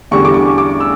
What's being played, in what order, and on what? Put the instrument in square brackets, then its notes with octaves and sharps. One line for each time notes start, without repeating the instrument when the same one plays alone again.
[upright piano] E2 D3 G3 C#6
D6
C#6
D6
E6